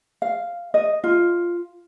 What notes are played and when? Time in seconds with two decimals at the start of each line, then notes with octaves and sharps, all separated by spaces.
0.22 F5
0.74 D#5
1.04 F4